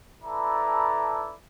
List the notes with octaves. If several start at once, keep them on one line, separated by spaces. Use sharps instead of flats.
E4 A4 B4 D5 A5 A#5